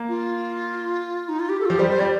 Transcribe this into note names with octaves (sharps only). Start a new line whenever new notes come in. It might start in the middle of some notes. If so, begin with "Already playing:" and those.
Already playing: A#3
F4
D#4
F4
G4
A4
F4
F3 G4
G3 C5
G3 C5
G3 D5